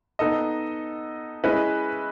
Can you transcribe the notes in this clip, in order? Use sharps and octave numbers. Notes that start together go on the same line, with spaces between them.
B3 D#4 A4 D#5
G#3 C#4 E4 B4 D#5